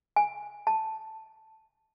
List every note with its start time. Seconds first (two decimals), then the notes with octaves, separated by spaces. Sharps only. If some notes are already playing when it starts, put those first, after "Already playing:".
0.16 G#5
0.67 A5